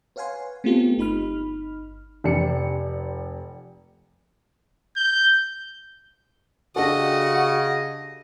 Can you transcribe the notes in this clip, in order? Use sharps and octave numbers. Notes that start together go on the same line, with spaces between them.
B4 C#5 F5 F#5 G#5 C6
A3 B3 C4 F4 G4 A4
G1 D#4 B5 F6
F1 G4 D5 C#7
G6
C#3 D4 F#4 G4 A4 D#5